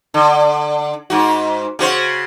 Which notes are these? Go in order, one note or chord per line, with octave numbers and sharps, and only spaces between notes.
D3
G#2 F#4
C#3 F#4 C5